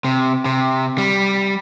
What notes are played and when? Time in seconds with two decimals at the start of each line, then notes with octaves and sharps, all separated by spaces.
0.05 C3
0.45 C3
0.98 G3